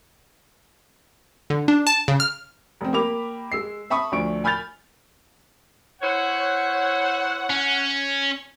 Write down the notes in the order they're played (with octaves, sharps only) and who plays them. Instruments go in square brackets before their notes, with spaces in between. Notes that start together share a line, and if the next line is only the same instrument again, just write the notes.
[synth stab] D3
D4
A5
C#3
F6
[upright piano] F1 C4
A#3 G4 A#4 B5 D6 F7
G#3 E6 C7
E5 A5 B5 C#6 D#6
D2 F3 D4 C#6 D7
G#5 B5 F6 G6 A6 F7
[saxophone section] E4 C5 C#5 [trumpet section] F#5
[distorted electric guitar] C#4